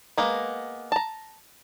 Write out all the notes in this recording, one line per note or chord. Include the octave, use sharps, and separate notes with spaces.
G#3 A#3 B3
A5 A#5